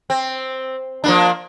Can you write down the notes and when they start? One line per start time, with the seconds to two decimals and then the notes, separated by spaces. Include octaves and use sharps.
0.10 C4
1.04 F3 A#3 D4